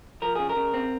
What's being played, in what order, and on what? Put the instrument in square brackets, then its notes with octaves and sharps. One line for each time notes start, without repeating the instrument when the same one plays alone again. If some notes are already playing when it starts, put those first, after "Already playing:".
[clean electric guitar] F3 A#4
C#3 G#4
A#4
C#3
C4